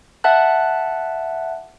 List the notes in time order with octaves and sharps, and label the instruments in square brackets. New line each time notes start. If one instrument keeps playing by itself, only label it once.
[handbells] E5 F#5 A5 F#6